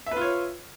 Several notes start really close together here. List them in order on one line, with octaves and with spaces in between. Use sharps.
E5 B4 F4 C#5